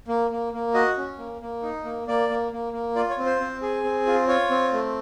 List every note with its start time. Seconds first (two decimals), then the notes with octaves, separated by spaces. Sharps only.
0.08 A#3
0.31 A#3
0.53 A#3
0.74 F#4 D#5
0.97 C#4
1.18 A#3
1.41 A#3
1.63 D#4
1.85 A#3
2.07 A#3 D5
2.29 A#3
2.52 A#3
2.73 A#3
2.96 F4 D5
3.10 C#5
3.18 C4
3.26 C5
3.40 C4
3.62 G#4
3.84 C4
4.06 F4
4.28 F4 C#5
4.50 C4
4.73 A3